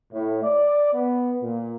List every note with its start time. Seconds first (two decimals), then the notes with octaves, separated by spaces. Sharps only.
0.13 A2
0.43 D5
0.93 B3
1.42 A#2